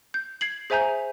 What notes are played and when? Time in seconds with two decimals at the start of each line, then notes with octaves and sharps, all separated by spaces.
0.14 G6
0.41 G#6 C7 F#7
0.70 G#4 C5 E5 G#5 A#5 G6